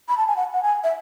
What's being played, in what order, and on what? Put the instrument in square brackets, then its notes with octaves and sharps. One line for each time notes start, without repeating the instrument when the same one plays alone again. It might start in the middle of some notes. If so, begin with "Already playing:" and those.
[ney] B5
A5
G#5
F#5
F#5
G#5
E5